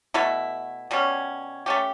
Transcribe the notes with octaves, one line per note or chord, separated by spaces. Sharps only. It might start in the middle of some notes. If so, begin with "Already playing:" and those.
B2 A3 E4
B2 G3 C#4
A3 C#4 G4